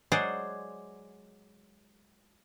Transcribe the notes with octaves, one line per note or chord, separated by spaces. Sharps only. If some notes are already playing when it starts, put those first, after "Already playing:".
F#3 G#3 G#4 C5 D5 F#5